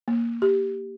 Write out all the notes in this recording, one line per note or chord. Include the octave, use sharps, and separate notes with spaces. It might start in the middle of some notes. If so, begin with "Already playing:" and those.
A#3
G4